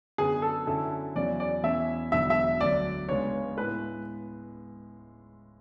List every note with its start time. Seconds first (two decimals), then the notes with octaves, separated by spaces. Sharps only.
0.18 F#2 D3 F#3 B3 G#4
0.42 A4
0.66 F#2 D3 F#3 C#4 E4 A4
1.15 E2 C#3 F#3 C#4 E4 D5
1.40 D5
1.63 E2 B2 A3 C#4 E4 E5
2.12 E1 E2 D3 F#3 E5
2.30 E5
2.61 D2 D3 F#3 D5
3.09 C#2 C#3 G#3 B3 D4 C#5
3.57 A2 G#3 B3 B4